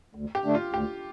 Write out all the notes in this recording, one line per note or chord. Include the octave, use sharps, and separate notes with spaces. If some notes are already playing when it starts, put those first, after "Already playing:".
D2
G4
D3 A3 D4
F4
D2 G4